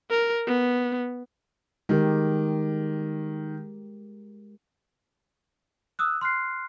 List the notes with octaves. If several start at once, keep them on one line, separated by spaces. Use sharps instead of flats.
A#4
B3
D#3 G#3 G4 A#4
D#6 E6 F#6
C6 F6 F#6 C7